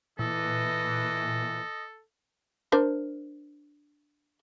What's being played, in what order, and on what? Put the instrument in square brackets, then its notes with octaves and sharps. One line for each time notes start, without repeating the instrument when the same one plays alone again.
[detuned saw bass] A#2 [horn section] E3 [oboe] A4 [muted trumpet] D#5
[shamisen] D4 A#4 C5